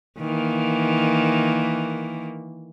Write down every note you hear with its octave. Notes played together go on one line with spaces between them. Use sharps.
D#3 E3 A#3